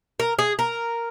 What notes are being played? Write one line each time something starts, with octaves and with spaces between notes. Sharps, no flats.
A#4
G#4
A#4